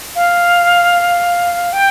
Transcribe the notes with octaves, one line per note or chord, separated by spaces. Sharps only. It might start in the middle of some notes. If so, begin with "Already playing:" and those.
F5
G5